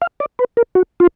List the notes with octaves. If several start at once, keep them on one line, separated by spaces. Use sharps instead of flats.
F5
D5
B4
A#4
F#4
F4